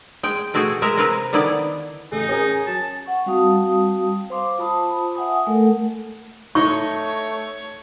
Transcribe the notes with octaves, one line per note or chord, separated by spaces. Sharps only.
G#3 G5
B2 A3 F#4 G#4 G5
G#3 A#4 E5
C3 C4 A#4 B4
D3 D#3 B3 E4 D5
A1 D#4 A4 G#5
C#4 G#4 A#4
F#3 A5
F#5 C#6
G3 C4 F#4 F5 A5 D#6
C5 F5 C6 D6
F4 C5 A5 B5 D#6
E5 F#5 G#5 D#6
A3 A4 A#4 F#5
A3 D#4 C#5 C#6